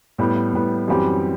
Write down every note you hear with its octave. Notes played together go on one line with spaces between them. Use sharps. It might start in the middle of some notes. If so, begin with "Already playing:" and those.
A2 G3 B3
A2 G3 B3
F#2 E3 G3 C4 G4